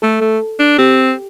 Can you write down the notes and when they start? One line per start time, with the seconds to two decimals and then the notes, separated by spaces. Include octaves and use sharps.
0.02 A3 A4
0.21 A3
0.59 D4
0.78 C4 G4